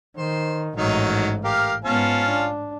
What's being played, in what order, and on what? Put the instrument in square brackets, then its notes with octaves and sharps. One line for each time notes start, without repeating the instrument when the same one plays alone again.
[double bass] D#3 [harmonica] C5
[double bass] A1 G#2 [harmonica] D#3 F#3 D#4
[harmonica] G4 A#4 F5
[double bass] G#2 B3 [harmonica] C#4 F4 A5
[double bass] D4